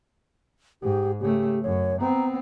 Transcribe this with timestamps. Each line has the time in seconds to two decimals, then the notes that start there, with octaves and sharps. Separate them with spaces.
0.82 G#2 G4
1.21 C#3 A3 G4
1.63 F#2 C#5
2.00 B3 C4 A#5